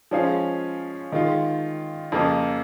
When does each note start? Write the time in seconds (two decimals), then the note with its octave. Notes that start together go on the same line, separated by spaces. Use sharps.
0.11 F3 G#3 C#4 G#4 F5
1.12 D#3 G#3 F4
2.12 F2 C#3 A#3